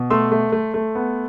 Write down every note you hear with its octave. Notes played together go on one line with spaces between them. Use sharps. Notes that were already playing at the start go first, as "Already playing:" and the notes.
Already playing: B2
A3 C6 E6
A3
A3
A3
B3